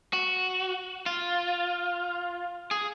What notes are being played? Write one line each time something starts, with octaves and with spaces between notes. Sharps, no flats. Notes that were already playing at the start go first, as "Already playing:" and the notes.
F#4
F4
G#4